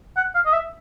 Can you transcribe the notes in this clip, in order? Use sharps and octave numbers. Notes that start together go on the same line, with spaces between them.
F#5
F5
D#5
E5